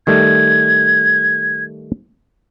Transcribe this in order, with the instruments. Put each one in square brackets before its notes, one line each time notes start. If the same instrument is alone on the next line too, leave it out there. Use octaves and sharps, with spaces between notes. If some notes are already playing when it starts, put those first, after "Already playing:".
[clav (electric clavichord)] D#3 G3 A3 [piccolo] G#6